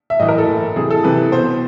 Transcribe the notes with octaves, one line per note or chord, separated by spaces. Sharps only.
E5
A2 E3 D#5
A#4
A4
A2 E3
C3 E3 G#4
A4
C3 E3 B4
B2 C5